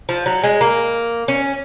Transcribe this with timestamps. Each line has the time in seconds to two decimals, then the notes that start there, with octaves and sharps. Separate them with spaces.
0.09 F3
0.26 F#3
0.43 G#3
0.61 A#3
1.28 C#4